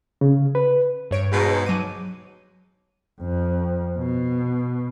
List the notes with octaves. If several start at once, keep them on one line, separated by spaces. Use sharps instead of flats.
C#3
B4
G2 C#5 D7
G#2 B2
F#3 D6 D#7
F2
B2